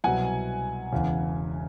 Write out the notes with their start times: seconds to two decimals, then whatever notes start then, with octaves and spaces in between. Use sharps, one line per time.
0.04 C2 B2 F#3 F#5 G#5
0.92 E1 E2 C#3